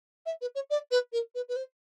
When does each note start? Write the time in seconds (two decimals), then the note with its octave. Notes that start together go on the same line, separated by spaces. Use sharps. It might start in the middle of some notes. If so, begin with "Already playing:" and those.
0.26 E5
0.41 B4
0.55 C#5
0.70 D5
0.91 B4
1.12 A#4
1.35 B4
1.49 B4
1.56 C5